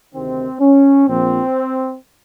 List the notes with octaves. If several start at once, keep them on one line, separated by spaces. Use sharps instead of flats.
D2 C3 D#3 C4
C#4
A#1 A#2 F3 C4